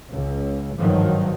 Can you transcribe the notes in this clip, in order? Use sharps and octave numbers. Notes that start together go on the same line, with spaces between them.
C#2
G#1 G2 D#3 F3 F#3